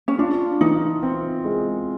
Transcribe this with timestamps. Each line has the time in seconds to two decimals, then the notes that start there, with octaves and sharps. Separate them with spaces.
0.08 C#4
0.18 D4 F4
0.61 E3 D#4
1.03 C4
1.45 G#3